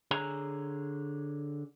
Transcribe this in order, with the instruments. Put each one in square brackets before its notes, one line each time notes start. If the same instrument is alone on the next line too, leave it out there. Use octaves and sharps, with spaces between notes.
[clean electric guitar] D3 G#4 C#5 G#5 A#5